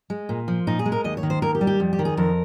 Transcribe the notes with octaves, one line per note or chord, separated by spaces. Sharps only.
G#3
A#2
F3
A#2 D#4
G#4
G#3
A#4
D#2 D#5
C#5
D#3
C5
D#2 A#4
G4
G3
G4
F2
G4
D#3
G#4
F2 A#4